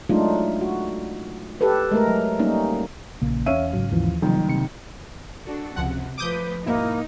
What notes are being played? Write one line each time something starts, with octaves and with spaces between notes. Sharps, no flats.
F#3 G#3 A3 D4 D#4 F4
F#4
G4 A4 B4
G#3 A3 A#4
F#3
G3 A#3 C#4 D#4
A#1 C#3 A#3
E2 C#4 C#5 E5 F5 D#7
G#1 G#2 C#3 F#3
D#2 E3 F3
F#1 C3 D#3 F3 G3
C3 C#7
D4 F#4 A4
C#2 C3 F3 F#5
F3 A3 B4 D6 D#6 G6
G#2 B2 A#3 D#4 E4